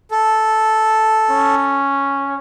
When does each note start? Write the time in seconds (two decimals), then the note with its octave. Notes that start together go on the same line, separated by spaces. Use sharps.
0.11 A4
1.30 C#4